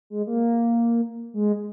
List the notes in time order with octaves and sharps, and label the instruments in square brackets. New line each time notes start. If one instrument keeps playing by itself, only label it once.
[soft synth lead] G#3
A#3
G#3